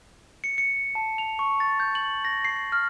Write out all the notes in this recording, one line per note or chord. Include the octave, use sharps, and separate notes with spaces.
C#7
C#7
A5
F7
C#6
A6
G6
F#7
A#6
C7
F6